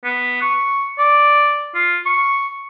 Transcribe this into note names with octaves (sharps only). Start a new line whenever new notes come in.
B3
C#6
D5
F4
C#6